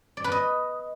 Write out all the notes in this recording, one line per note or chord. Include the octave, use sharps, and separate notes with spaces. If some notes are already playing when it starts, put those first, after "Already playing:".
D5
B4
D#5